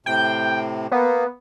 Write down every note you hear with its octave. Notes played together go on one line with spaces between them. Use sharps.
A2 C3 G5
A#3 B3